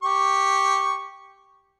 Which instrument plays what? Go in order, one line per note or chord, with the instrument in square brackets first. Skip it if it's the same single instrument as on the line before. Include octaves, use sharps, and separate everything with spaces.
[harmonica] G4 C#6